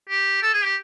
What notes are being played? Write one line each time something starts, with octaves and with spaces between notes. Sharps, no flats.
G4
A4
G#4
G4